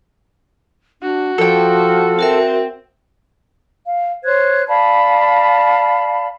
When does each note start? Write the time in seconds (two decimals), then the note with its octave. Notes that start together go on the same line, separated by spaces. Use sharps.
1.02 D4 F#4
1.38 F3 A4 G5
2.19 C4 F#4 A#4 E5
3.85 F5
4.25 C5 C#5 F#6 G#6
4.68 D5 F5 A5 B5